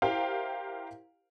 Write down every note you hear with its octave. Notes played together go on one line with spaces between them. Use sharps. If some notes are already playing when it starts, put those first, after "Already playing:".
E4 G4 A#4 C5 F5 G5